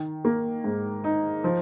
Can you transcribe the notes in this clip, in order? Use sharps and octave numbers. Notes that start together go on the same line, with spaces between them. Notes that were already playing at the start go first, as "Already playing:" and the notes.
Already playing: D#3
A#3
G#2
D#4
F3